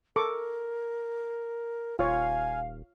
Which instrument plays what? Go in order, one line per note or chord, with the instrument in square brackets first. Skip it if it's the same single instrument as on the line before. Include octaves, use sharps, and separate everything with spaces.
[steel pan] A4 C#6 D6 [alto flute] A#4
[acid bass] D#1 [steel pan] F4 C#5 [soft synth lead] F5 [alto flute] G#5